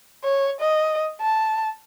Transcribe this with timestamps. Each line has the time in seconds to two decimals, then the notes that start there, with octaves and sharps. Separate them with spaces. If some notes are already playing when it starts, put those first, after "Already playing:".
0.24 C#5
0.61 D#5
1.22 A5